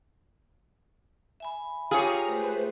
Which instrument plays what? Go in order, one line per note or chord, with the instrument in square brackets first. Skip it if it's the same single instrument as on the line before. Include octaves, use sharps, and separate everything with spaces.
[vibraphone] E5 G#5 B5
[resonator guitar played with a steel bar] F4 G4 C#5 [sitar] G#4 [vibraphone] G#5 [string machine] A#5 F6
[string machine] A3 B4 C5